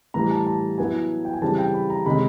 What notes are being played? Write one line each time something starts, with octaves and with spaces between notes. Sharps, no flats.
A2 E3 G3 A#5
A5
A5
F#3 B3 E4 G#5
G5
G#5
C#3 E3 G3 C4 A5
G5
B5
A#5
C3 D#3 G#3 C#4 B5